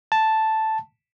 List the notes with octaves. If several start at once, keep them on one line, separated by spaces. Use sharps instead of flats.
A5